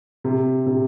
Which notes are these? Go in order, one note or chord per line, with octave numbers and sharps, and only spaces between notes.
C3
C3